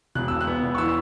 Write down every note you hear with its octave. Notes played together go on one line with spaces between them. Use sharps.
E1 F#6
E1 E6
F#6
B3
E1
C#6
E3 E6